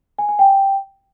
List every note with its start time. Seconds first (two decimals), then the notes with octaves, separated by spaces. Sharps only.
0.18 G#5
0.29 G#5
0.39 G5